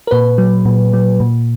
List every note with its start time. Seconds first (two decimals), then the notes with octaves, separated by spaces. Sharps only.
0.07 A#4
0.11 A#2 B4
0.38 F#3
0.65 A#2
0.93 F#3
1.20 A#2